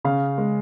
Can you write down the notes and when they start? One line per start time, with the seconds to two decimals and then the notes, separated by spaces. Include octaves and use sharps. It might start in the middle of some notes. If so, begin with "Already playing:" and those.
0.04 C#3 F5
0.38 G#3